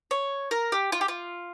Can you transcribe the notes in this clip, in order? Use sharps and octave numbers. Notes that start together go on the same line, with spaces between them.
C#5
A#4
G4
F4
G4
F4